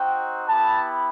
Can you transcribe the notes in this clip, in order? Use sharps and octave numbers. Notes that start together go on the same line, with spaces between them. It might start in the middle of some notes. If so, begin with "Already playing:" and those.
Already playing: C4 D#4 F#4 G5
B3 E4 G4 A5